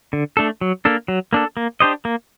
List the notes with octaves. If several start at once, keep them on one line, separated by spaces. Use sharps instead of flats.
D3
A3 D4 A4
F#3
A#3 D4 A4
F#3
A#3 D4 A4
A#3
D4 G4 C5 D#5
A#3